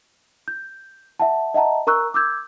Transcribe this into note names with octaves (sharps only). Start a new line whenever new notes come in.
G6
E5 F#5 A5
D#5 E5 F#5 A5 A#5
A#4 A#5 C#6 E6 F#6
D6 E6 G6 G#6